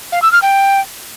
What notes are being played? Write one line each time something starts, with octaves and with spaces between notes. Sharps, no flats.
F5
E6
F6
G5